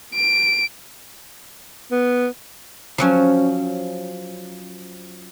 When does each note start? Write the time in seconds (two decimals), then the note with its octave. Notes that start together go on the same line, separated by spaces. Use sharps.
0.14 D7
1.91 B3
2.98 F3 F#3 C#4